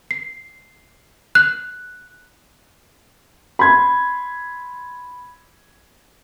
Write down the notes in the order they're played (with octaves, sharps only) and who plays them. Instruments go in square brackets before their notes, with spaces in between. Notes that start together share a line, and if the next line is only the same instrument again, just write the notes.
[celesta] C7
F#6
[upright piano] B5 C6 G#6